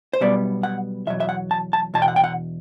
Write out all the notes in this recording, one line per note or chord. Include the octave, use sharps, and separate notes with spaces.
C5
B1 B2 G3 B3 D5
F#5
E2 B2 F#3 E5
E5
F#5
A5
A5
E2 B2 A5
G5
F#5
G5
F#5